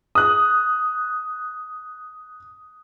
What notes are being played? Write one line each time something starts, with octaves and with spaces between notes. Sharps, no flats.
D#6 F#6